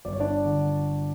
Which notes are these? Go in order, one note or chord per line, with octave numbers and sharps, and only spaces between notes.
G1 D5
C#5
D4 D5
D3